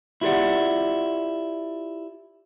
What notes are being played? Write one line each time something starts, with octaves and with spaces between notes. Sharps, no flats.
E4 F4 G4 A#4 D5 F#5